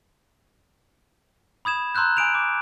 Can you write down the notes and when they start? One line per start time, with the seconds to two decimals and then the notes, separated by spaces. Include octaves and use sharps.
1.65 B5 D#6 G#6 E7
1.95 A#5 C6 E6 F#6 G6
2.17 G#5 C6 D#6 D7 E7 F7
2.35 D6